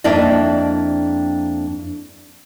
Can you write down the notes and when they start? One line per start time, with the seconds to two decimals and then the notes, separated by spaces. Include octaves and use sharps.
0.04 F2 A#3 D4 E4 D5 D#5